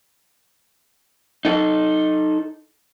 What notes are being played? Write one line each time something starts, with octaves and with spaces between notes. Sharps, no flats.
D#4 A4